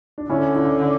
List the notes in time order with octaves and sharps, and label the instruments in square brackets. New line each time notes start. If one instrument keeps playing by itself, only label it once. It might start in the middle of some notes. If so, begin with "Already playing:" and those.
[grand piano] D4
[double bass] D3 [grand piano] C#4 E4
[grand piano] C#4 E4